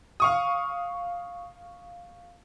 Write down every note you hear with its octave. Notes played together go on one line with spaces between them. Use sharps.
F5 C#6 D#6